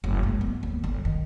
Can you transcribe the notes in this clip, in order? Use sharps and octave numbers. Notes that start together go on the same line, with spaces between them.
F#1
G#2
B3
D#2
G1
D#3